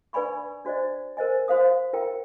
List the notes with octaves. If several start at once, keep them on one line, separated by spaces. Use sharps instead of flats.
D4 B4 D5 G#5 B5 C#6
D4 F#4 C5 D5 D#5
A#4 C5 D#5 G#5
F#4 C5 F5 D#6
F4 A#4 G5